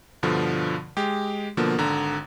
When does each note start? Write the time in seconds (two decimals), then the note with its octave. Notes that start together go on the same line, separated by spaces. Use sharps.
0.23 G2 B2 D3 F3
0.97 G#3 G4
1.57 B2 D3 F3 A#3
1.78 G#1 D3 A#5